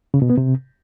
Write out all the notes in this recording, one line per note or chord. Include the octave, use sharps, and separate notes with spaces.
C#3
B2
B3
C3